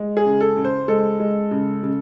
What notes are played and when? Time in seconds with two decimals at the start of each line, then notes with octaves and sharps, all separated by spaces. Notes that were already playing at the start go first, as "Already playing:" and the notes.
Already playing: G#3
0.17 G#4
0.25 C#3
0.40 A4
0.57 C#3
0.64 C5
0.88 G#3 A4
1.20 G#3
1.51 C#3
1.83 C#3